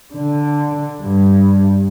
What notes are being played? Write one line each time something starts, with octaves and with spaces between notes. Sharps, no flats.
D3
G2